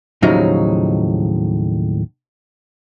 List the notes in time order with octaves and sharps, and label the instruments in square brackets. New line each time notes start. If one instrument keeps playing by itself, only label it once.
[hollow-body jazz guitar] D#2 A2 C#3 F3 F#3 D#4